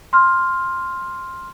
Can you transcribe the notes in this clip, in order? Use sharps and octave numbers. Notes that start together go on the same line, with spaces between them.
C6 F6